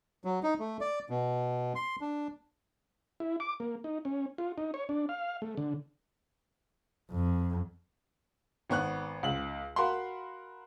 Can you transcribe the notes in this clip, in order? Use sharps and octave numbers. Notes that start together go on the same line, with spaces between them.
F#3
D#4
A3
D5
B2
C6
D4
E4
D6
A#3
D#4
C#4
F4
D#4
C#5
D4
F5
A3
D3
F2
G#1 B3 C#6 F#6
C#2 F#7
F#4 A#4 F5 B5 C6